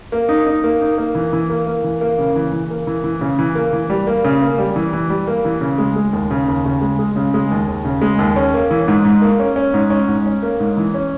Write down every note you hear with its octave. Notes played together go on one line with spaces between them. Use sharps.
A#3
D#4
D#4
A#3
D#4
A#3
E3
E3
A#3
A#3
E3
A#3
C#3
E3
E3
A#3
E3
E3
C#3
E3
A#3
E3
G3
A#3
C#3
A#3
G3
E3
E3
G3
A#3
E3
C#3
G#3
G#3
D#2
C#3
D#2
C#3
G#3
G#3
C#3
G#3
D#2
D#2
C#3
G#3
D#2
C#4
A#3
E3
G#2
G#2
A#3
C#4
C#4
G#2
C#4
G#2
C#4
A#3
G#2
E3
C#4